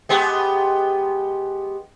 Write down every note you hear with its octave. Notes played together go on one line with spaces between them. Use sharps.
G#3 B3 G4